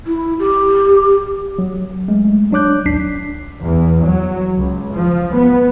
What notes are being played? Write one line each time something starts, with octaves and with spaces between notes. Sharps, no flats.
E4
G4
F#3
G#3 A3
F#3 D4 C#5 D6 F#6 G6
G#1 D2 D4 B6 C7
E2
F#3
C#2
F3
B3